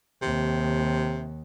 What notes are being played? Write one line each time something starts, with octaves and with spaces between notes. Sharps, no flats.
D#2 C3